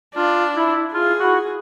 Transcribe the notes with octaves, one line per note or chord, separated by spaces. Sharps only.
D4 F4
E4
F4 G#4
E4 F#4